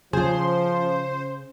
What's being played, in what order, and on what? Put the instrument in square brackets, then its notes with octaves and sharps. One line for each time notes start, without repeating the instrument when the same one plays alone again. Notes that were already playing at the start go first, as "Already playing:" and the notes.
[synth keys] C#3 [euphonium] F3 [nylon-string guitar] F4 G#4 [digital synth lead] C5